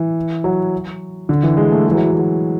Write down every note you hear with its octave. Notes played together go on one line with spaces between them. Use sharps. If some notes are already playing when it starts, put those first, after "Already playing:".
Already playing: E3
F#3
D3
E3
G#3
A3
E3 G#3
F#3
F#3
E3
F#3